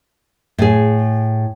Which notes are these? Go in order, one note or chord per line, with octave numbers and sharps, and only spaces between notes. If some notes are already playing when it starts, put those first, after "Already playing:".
A2 G#4